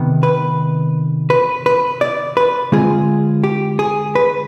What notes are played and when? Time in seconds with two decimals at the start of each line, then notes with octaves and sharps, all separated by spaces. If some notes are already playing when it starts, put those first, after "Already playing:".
Already playing: C3 D#3 B3
0.23 B4
1.30 B4
1.66 B4
2.01 D5
2.37 B4
2.72 D3 G#3 C4 F4 G#4
3.44 G4
3.79 G#4
4.15 B4